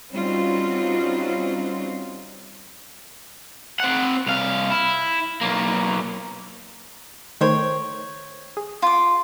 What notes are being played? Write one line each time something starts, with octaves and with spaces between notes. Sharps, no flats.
G3 C4 C#4 D#4 F4 F#4
C4 F#5
C2 F5
E4
B1 A#3
D#3 A3 C5 C#5 G5
G#4
F4 D6